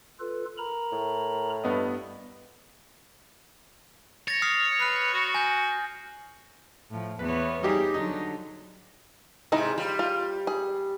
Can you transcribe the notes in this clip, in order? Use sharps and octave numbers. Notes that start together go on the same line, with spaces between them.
F4 A4 B4
A#4 A#5 B5
A2
G2 B3 D#5
C#5 A6 A#6
D#6 F6 C7
B4 F6 C7
F#4
G#5 G6
A2 F3
E2 B3 B4 C#5
G3 D#4 G4 G#4
D3 F#3 D#4
G#2 C3 D#4 E4 D#5
G3 F4
F4
G#4